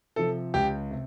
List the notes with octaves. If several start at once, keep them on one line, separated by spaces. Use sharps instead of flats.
C3 F3 A4
C#2 G4
C3